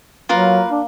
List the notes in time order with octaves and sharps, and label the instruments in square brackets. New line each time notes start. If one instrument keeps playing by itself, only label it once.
[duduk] F#3 [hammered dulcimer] A#3 [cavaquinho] F4 A#4 B4
[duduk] D4